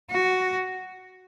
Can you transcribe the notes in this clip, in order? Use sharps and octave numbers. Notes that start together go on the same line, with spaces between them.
F#4